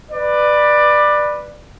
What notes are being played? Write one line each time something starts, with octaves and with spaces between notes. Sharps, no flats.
B4 D5